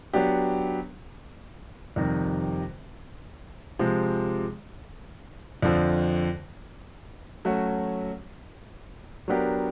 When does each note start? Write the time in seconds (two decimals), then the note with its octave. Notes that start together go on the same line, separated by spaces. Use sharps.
0.13 F#3 B3 D4 G4
1.96 F2 C3 D#3 G3
3.79 C3 F3 G#3
5.62 F2 D3 F3
7.45 F#3 A3 C#4 F#4
9.28 F#3 B3 D4 G4 A#4